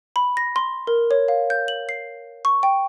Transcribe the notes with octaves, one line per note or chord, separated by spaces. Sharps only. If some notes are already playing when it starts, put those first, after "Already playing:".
B5
A#6
C6
A#4
C#5
F5
G6
F#7
C7
C#6
G5